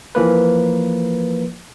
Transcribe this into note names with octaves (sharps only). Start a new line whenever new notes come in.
E3 F3 A#3 B4